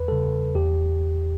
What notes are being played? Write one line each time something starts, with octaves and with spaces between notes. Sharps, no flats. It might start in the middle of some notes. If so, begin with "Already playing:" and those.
Already playing: E2 B4
C#3 G3 A4
E2 G4